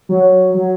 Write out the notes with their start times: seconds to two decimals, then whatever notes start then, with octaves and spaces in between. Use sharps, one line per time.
0.09 F#3
0.54 F#3